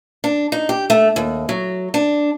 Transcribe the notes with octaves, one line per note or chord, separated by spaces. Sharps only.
D4
D#4
G4
A3
D#2
F#3
D4